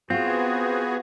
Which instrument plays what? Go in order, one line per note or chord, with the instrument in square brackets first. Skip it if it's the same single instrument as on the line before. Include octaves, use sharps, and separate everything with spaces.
[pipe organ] B3 G#4 [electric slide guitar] C4 [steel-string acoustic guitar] F4 [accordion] F#4